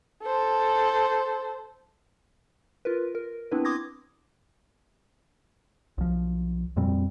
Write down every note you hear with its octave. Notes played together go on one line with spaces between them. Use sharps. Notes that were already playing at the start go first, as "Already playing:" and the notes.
A4 C5
F4 A#4 B4
A#4
B3 C4 D4 E4 B4
C6 D6 D#6 G#6 A#6
B1 F3
F2 A#2 G3 C4